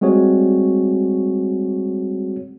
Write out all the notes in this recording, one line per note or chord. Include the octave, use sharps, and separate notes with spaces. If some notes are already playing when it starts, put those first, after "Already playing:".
G3 G#3 C4 F#4 G#4 C#5